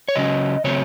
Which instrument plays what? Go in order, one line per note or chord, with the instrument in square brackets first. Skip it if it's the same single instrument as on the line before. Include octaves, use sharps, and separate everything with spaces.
[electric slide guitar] C#5
C#3 F#3 C#4 D#5
C#3 F#3 A3 C4 C#5